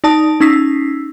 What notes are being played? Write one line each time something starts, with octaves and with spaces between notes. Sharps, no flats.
D#4 D5 A5 D#6 D7
C#4 D#4 E6 B6 C7